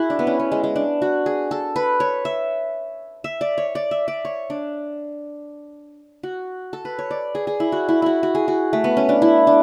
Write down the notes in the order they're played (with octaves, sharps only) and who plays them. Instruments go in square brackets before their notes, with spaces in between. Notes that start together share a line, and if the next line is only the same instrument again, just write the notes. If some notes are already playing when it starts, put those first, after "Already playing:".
Already playing: [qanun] E4 F#4 G#4
D4
B3
C#4
B3
G#3
G#3
D4
F#4
G#4
A4
B4
C#5
E5
E5
D5
C#5
D5
E5
D5
C#5
D4
F#4
A4
B4
C#5
D5
G#4
G#4
E4
F#4
E4
E4 F#4
F#4
G#4
F#4
A3
B3
C#4
D4
E4
D4